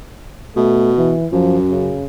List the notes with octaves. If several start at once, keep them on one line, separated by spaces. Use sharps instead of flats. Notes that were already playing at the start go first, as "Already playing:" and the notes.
B2 A3
E3
F#2 F3
C#3